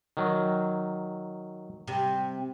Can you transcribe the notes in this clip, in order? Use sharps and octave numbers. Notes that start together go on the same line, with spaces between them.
D#3 F#3
C3 G3